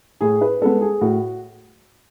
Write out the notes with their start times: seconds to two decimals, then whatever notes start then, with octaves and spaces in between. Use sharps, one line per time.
0.21 A2 G#4
0.41 B4
0.62 G#3 B3 A4
0.81 G#4
1.01 A2 F#4